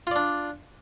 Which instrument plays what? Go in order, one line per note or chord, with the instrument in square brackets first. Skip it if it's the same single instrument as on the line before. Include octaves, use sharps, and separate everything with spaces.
[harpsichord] F4
D5
D4